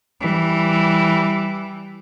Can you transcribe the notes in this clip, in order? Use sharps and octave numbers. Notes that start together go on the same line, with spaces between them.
E3 G3